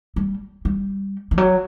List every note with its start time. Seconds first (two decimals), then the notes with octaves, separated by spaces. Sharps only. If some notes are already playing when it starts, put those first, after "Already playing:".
0.16 G3
0.65 G3
1.31 E3
1.38 F#3